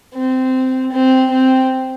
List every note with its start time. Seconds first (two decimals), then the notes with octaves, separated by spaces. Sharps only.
0.14 C4
0.92 C4
1.31 C4